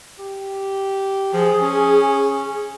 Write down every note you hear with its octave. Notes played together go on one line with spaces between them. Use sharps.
G4
F3 G#4
C#4